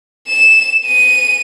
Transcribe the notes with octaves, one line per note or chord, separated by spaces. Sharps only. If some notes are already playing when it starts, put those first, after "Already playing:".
E7
D#7